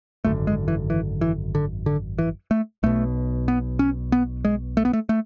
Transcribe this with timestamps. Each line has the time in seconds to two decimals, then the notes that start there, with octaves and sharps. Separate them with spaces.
0.25 G#1 F#2 D3 A3
0.47 G#3
0.68 E3
0.90 E3
1.21 E3
1.55 D3
1.86 D3
2.18 E3
2.51 A3
2.83 B1 B2 A3
3.48 B3
3.79 C#4
4.12 B3
4.45 G#3
4.77 A3
4.85 B3
4.93 A3
5.09 A3